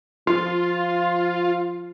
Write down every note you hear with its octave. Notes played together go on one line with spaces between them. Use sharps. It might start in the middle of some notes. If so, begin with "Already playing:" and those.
F3 F4